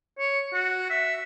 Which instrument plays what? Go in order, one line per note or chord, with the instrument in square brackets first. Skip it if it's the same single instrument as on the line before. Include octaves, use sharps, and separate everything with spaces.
[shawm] C#5
F#4
E5